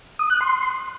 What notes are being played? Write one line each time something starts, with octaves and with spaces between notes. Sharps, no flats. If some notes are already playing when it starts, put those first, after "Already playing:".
D#6
F#6
C6